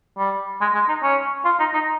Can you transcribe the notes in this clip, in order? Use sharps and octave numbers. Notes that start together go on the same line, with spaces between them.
G3
G#3
G#3
D#4
C#4
F4
D#4
D#4